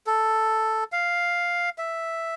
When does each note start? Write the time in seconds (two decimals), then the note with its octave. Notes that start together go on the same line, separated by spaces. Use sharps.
0.07 A4
0.92 F5
1.78 E5